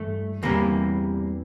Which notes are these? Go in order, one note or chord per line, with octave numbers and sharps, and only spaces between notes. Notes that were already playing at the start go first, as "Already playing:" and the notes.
Already playing: G2 E3 A3
E2 C3 E3 G3 A#3